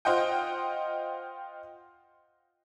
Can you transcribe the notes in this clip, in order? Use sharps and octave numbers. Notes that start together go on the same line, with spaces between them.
F4 C5 D#5 F#5 G5